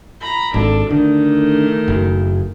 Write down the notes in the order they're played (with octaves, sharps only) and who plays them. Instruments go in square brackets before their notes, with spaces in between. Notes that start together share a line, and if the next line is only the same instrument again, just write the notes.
[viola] A#5 B5
[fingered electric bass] G#1 [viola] D4 A4
[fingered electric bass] D3 [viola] D#3 A3
[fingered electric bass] F#1